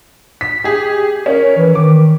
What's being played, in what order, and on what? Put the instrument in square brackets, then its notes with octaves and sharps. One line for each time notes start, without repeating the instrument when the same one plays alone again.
[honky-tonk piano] B6
G4 G#4
[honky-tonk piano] C#4 [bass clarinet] A#4
[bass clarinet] E3
[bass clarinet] D#3 [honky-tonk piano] D6